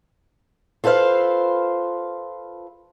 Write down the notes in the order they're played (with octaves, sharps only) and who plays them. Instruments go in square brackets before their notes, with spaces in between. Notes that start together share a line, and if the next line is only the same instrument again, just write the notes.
[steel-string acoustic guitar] F4 A4 B4 C5 F5